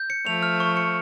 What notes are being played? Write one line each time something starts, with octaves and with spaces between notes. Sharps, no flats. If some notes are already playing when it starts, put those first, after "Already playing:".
Already playing: G6
C#7
F3 A3 F7
F6
C#6
C#7